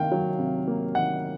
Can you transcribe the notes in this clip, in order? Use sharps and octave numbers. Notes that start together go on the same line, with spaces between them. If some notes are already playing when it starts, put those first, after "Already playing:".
Already playing: C3 D#3 A#3 F5 G5
F#3
C3
A#3
D#3 F#5